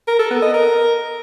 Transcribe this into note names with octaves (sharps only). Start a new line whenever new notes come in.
A#4
A4
B3
D#5
A#4